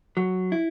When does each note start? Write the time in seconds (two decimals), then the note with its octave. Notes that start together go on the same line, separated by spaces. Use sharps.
0.17 F#3
0.52 E4